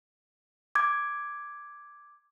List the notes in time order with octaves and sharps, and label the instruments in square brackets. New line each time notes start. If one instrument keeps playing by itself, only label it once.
[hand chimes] D6 G#6